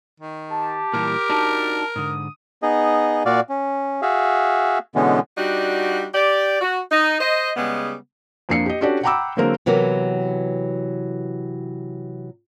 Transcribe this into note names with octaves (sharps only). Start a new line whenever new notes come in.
D#3
G4 A5
A#2 E3 G3 A#4
D4 D#4 F#4 A5
G#2 D3 D#6
B3 D#4 G#4 D#5
A#2 F#4 D5 F5
C#4
F#4 G#4 E5 F5
B2 D3 E3 G#3 B3 C#4
G3 D4 D#4 F#4
G4 D5
F#4
D#4
C5 D#5
C#3 G3 G#3 B3
F2 A#3 D4 C7 C#7
G4 D#5
C#4 D4 F#4 G4 A4 D5
F#5 G5 A#5 B5 D6 E6
D3 F#3 G#3 A#3 C4 A#4
C3 E3 F#3 B3 A#4